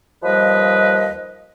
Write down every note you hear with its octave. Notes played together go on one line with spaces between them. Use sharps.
D#2 F3 G3 B4 D#5